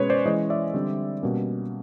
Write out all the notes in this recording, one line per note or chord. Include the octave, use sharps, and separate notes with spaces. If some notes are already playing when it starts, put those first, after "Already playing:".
Already playing: B2 G#3 C#4 B4 C#5
C5 D5
E3 G#3 C#4 C#5 D#5
D5 E5
D3 G3 C4
B2 G3 A#3 C#4